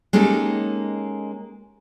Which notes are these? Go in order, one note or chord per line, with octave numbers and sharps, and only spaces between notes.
G#3 A#3 C#4 D#4 G4 A4